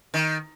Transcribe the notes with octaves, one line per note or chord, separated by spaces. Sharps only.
D#3